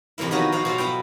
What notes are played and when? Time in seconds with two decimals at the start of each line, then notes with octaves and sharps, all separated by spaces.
0.18 F2 C3 E3 A#3 E4
0.31 D#3 F#3 B3 F#4 A#4 C#5
0.52 F3 B3 F#4 F5
0.65 B2 F3 F4 A4
0.78 F#3 B3 E4 G5